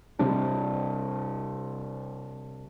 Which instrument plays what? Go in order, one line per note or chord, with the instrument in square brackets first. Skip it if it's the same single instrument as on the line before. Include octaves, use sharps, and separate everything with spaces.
[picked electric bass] C3 G3 D4